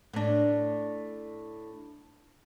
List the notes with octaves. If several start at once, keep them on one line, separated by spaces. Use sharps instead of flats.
A2 D4